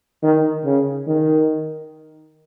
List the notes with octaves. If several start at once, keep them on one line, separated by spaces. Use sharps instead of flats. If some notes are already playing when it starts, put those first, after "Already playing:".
D#3
C#3
D#3